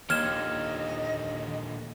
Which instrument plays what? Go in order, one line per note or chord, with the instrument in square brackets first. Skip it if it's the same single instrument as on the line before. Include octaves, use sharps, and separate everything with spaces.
[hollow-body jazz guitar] D#2 [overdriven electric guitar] A#2 D3 [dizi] D#5 [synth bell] F6 G#6 E7